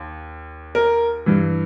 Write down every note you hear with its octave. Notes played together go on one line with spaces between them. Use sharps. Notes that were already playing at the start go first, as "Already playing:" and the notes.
Already playing: D#2
A#4
G2 E3